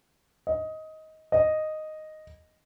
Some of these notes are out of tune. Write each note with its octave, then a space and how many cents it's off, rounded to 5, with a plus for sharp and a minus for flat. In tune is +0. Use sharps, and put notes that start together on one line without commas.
D#5 +15
D#5 -5